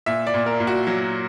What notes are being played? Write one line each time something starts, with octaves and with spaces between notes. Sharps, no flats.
A#2 E5
D5
A#2
A#4
A#2
F#4
F#3